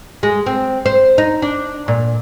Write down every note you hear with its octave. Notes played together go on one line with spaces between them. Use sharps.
G#3
C4
C5
D#4
D4
A#2